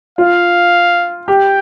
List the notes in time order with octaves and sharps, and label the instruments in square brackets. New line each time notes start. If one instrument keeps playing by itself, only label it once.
[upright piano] F4 [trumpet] F5
[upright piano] G4 [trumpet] G5